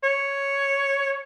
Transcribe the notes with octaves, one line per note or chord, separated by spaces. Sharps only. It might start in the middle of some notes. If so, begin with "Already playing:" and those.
C#5